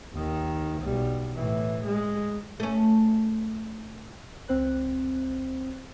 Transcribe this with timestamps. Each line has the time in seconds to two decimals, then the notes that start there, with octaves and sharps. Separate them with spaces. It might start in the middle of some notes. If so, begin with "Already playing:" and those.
0.13 D#2 D#3
0.82 B1 G3
1.36 A2 E3
1.85 G#3
2.60 A3 C#4
4.48 C#2 C4 C5 F#6